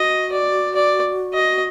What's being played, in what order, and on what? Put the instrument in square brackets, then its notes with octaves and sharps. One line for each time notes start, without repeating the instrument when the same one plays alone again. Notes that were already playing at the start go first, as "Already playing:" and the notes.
Already playing: [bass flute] F#4 [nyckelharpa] D#5
[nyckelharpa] D5
D5
D#5